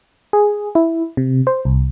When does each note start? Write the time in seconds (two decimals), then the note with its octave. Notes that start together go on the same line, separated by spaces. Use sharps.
0.33 G#4
0.75 E4
1.17 C3
1.47 C5
1.65 C2